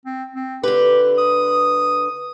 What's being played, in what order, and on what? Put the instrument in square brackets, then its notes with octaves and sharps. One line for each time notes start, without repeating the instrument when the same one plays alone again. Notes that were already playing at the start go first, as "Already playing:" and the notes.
[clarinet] C4
C4
[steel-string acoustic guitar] D3 B4 [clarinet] G4
[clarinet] D#6